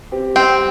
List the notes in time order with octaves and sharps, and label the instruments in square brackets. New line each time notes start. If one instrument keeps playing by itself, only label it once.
[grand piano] C4 G4
[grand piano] G3 [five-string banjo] C4